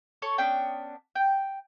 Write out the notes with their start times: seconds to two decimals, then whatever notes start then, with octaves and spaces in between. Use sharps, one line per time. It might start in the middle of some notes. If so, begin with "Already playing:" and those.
0.22 A4 C#5 C#6
0.38 B3 C#4 D4 G5
1.15 G5